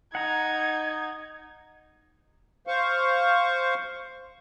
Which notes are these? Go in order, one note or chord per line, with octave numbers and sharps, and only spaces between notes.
D#4 F#5 A#5 G#6
C5 F5 C#6